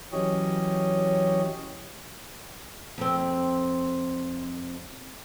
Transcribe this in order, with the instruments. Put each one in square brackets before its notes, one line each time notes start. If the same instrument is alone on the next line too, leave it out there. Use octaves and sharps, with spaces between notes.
[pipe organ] E3 F#3 C#4 G4 C#5 D#5
[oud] F2 C4